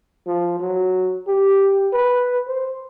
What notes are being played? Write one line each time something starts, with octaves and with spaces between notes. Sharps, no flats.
F3
F#3
G4
B4
C5